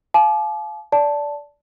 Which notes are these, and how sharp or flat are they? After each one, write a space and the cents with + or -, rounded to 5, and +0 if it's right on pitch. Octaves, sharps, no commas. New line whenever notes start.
F5 +0 A5 -45 D6 +20
D5 -15 A5 +0